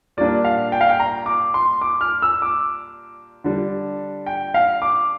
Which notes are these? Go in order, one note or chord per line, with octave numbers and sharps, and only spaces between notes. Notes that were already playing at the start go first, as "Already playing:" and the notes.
A#2 G3 A#3 D4 D5
F5
G5
F5
G5
A#5
D6
C6
D6
F6
E6
D6
D3 G3 D4
G5
F5
D6